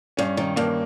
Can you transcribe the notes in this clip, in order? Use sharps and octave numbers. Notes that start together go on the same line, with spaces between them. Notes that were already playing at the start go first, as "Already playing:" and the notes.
G2 C#4
D#3 C#4
G2 A#3